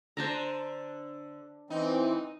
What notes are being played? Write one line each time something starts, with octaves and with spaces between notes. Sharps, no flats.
D3 C5 A5 A#5
E3 C4 D#4